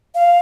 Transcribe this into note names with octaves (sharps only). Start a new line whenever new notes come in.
F5